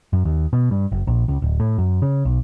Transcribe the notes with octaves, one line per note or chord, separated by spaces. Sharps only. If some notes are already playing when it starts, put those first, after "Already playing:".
F#2
D#2
B2
G2
F#1
A#1
C#2
D1
A2
F#2
C#3
B1